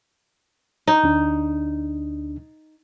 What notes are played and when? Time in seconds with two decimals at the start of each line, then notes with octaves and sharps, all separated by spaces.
0.87 D#4
1.03 D2 D4